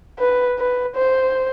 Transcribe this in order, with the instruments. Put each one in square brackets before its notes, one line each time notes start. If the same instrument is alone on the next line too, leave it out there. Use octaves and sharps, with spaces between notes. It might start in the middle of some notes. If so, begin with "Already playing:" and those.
[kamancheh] B4
B4
C5